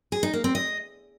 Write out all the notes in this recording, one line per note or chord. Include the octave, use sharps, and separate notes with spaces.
G#4
D#4
A#3
C4
D#5